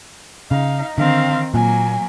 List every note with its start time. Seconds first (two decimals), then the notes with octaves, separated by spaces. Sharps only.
0.51 C#3 D#4 F5
0.98 D3 D#3 C4 F5
1.54 A#2 F#3 A#3 G#5